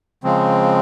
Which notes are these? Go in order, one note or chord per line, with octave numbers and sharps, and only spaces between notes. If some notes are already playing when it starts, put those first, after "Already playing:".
C#3 F3 G#3 C4